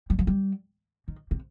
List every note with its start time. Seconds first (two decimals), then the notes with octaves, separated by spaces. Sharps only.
0.10 G3
0.19 F3
0.27 G3
1.08 D#3
1.31 C3